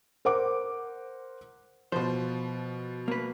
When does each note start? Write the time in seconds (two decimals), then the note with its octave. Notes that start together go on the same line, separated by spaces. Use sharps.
0.25 A#4 C5 F#5 D6
1.92 B2 F3 C5
3.08 A#3 B4